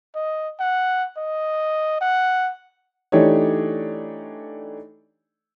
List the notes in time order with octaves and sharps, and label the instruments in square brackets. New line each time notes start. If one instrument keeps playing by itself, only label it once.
[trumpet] D#5
F#5
D#5
F#5
[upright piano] E3 A3 D4 D#4 G4 C#5